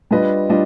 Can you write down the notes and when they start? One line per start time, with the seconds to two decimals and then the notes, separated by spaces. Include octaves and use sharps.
0.11 G3 D4 F4 B4 D#5
0.49 G3 D4 F4 D#5